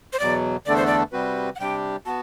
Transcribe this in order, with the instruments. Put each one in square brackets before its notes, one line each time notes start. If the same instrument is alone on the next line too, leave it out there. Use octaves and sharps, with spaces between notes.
[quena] C5
[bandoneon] E2 B2 F#3 [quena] D5
[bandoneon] E2 D3 A3 D4 A4 [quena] D5
[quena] C5
D5
[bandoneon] C3 G3 C4 F#4 B4
[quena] F#5
[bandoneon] C3 G3 D4 G4 [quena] G5
[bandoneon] B3 F#4 [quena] A5